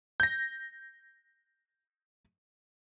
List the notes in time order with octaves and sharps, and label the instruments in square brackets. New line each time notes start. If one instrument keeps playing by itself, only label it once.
[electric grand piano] G6 A#6